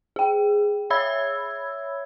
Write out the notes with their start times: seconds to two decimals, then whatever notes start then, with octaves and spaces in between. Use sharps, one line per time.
0.16 G#4 G5
0.90 C#5 E5 B5 E6 G#6